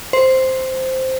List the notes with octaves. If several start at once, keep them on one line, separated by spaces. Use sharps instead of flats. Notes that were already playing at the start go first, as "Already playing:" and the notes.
C5